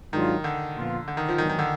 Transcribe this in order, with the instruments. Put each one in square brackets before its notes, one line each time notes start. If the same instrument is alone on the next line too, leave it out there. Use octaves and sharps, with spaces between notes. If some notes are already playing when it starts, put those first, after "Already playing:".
[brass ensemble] G#2 F#3 D4 F4 [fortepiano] D#3
[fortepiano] D3
[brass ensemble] A#2 F3 B3 F4
[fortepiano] D3
D#3
F3
[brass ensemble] G#2 F#3 B3 D4 G#4 [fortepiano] D#3
[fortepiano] D#3
D3